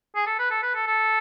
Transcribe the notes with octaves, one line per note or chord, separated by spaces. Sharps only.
G#4
A4
B4
A4
B4
A4
A4